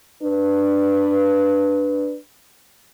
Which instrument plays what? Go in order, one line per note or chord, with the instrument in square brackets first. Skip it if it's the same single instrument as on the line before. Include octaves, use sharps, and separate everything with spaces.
[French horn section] D4 B4